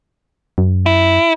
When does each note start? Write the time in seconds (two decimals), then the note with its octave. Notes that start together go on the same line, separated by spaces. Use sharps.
0.58 F#2
0.86 E4